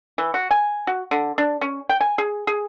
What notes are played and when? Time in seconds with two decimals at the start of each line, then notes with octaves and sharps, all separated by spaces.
0.18 E3
0.34 F#4
0.51 G#5
0.87 F#4
1.11 D3
1.38 D4
1.61 C#4
1.89 G5
2.01 G#5
2.18 G#4
2.47 G#4